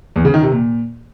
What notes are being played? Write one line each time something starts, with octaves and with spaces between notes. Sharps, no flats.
E2
C#3
D#3
C3
A#2